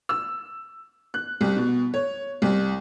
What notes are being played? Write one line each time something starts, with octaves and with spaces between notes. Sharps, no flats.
E6
F#6
C2
B2
C#5
C2